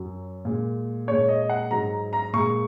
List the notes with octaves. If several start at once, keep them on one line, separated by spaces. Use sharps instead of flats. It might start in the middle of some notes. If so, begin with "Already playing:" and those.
Already playing: F#2 F#3
A#2 G#3
A#2 G#3 C#5
D#5
F#5
G#2 F#3 A#5
A#5
A#2 G#3 C#6